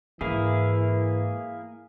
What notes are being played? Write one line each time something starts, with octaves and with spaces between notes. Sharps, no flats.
G#2 E3 A#3 E4 G#4